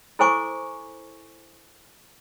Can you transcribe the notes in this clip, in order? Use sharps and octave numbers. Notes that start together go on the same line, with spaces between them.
E4 A4 C5 G#5 C#6 D6